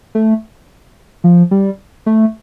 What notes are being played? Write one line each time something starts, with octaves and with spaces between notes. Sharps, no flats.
A3
F3
G3
A3